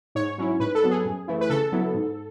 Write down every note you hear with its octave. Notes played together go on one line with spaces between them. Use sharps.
G#2 C#5
F#3 C#4 E4
G#2 B4
A4
F#3 B3
G#4
F#2
E3 A3 E4
B4
C#3 A4
F#3 B3 E4
G#2